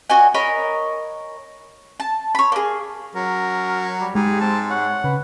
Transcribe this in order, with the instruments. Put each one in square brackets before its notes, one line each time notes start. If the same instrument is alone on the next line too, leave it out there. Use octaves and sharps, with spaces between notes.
[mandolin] F#4 D5 D#5 G#5
A#4 C#5 D#5 B5
A5
C#5 B5
A#3 G#4
[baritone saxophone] F#3 [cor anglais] C#4 [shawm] A#4
[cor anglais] G3
[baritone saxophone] G#2 [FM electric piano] G#3 [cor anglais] G4 [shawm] G#4
[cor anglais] C4 [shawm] A5
[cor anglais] C#5 [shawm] F#5
[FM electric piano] C#3 [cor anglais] B4